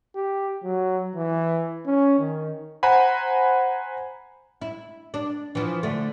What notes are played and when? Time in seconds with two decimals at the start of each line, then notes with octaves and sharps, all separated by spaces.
0.16 G4
0.64 F#3
1.16 E3
1.86 C#4
2.19 D#3
2.83 C5 F#5 G#5 A#5 B5
4.61 E4
5.14 D4
5.55 E3 F3
5.83 D3 A3